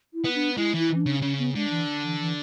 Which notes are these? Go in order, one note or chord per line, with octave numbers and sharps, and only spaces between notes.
E4
B3
D4
G#3 E4
E3
E4
C#4
D4
C#3
C#3 C#4
B3
D3 G#3
E3
E3
E3